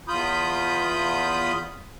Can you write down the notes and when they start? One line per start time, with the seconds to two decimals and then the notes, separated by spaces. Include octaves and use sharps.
0.08 E2 F4 B5 D#6 G6